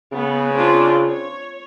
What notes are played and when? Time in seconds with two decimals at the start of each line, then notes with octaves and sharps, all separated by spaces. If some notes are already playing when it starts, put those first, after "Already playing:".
0.13 C#3 B3
0.56 C4 D4 F4
1.05 C#5